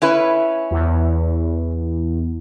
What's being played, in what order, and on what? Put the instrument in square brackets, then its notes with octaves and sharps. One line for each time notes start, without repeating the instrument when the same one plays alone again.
[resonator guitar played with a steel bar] C#4 E4 B4
[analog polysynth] E2